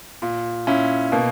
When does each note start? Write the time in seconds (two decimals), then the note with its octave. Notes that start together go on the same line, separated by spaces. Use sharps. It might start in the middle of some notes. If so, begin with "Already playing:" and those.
0.22 A#2
0.67 A#2 C#4 E4
1.12 B2 A#3